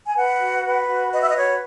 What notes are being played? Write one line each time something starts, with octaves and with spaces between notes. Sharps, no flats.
G#5
B4 F#5
F#4
B4
F#4
B4 D#5
E5
D#5
F#4 C#5